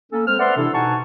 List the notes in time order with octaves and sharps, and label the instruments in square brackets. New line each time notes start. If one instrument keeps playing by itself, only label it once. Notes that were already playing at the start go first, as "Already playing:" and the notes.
[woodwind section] A#3 C#4 A4
G#3 C4 C5 F6
B4 C5 D5 E5 F#5 C6
C3 E3 D4 E4 A4
B2 D#4 F#5 G#5 A5 C#6